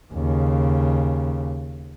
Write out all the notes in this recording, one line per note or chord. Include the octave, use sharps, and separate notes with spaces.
D#2 C#3